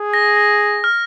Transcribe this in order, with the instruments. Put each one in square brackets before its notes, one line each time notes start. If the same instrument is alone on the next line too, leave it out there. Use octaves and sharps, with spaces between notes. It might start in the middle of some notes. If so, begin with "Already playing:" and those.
Already playing: [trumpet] G#4
[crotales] A#6
A#6
F6